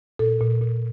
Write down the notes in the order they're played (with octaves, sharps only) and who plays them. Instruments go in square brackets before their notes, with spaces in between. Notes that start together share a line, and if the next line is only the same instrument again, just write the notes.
[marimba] A#2 A4
A#2
A#2